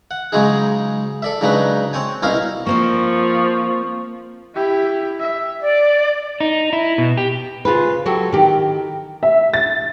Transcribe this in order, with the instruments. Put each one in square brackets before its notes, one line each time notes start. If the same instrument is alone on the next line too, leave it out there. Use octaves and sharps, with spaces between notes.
[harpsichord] F#5
G#2 C#3 F#3 G#3 D#4 G#4
A4 D5 E5
G#2 C#3 F#3 D4 D#4 B4
C4 C#5 G5 G#5
C2 B2 C#4 D#4 E4 F5
[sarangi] F3 [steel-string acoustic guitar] A#3 C4 D5 [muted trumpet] C#6
[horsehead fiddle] E4 G4
E5
[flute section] D5
[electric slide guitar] D#4
E4
B2
G4
[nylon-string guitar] C#3 F4 G#4 B4
F#3 F#4 G4 A4
D#3 G4
[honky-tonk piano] E5
A6